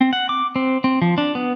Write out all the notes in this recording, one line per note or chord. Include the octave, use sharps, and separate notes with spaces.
C4
F#5
D6
C4
C4
F3
D4
B3